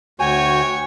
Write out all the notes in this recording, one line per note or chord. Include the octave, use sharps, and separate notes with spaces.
D2 F#4 C#5 G5 G#5